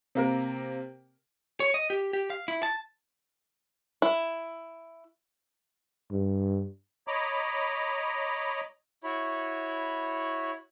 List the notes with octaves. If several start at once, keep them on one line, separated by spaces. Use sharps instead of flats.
C3 A#3 A#4
C#5
D#5
G4
G4
F5
E4
A5
E4
G2
C#5 D#5 A#5 B5 D6
E4 F#4 C#5 B5